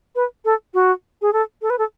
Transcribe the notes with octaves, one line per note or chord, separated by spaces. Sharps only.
B4
A4
F#4
G#4
A4
A4
B4
A4